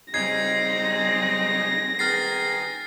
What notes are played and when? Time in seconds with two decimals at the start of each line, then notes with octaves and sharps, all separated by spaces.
0.14 C#3 G3 C4 D#4 G#6 A#6 C7
1.99 D#3 B3 G#4 F6 A6 C7